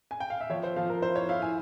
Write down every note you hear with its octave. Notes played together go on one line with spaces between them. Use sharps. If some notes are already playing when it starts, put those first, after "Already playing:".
G#5
G5
F5
E5
F3 C#5
C5
F3 F5
A#4
E4 C5
C#5
E4 F5
G#5